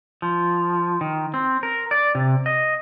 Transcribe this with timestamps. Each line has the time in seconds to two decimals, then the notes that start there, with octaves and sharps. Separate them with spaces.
0.22 F3
1.01 D#3
1.34 C4
1.63 A#4
1.91 D5
2.15 C3
2.46 D#5